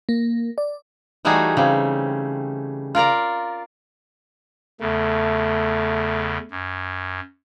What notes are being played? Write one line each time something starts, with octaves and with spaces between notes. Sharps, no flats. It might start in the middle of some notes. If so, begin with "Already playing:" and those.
A#3
D5
E3 G3 A3 D#4 F#4 G#4
C#3 G3 C4
F4 A#4 D5 A#5
E2 C#3 A3
F#2